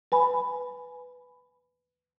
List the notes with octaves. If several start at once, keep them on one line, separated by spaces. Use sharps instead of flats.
B4 G#5 B5